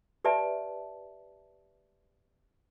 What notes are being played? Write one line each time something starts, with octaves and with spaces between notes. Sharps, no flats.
G4 B4 D5 E5 A5